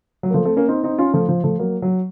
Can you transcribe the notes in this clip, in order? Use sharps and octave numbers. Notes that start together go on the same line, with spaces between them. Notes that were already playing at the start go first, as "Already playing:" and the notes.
F#3
A#3
F3 A3
A3 C4
A#3 C#4
C4 D#4
C4 D#4
C#4 F4
F3 A3
F3
F3 A3
F#3 A#3
F#3